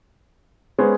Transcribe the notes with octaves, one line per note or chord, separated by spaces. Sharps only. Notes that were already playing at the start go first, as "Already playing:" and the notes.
G#3 B3 C#4 C5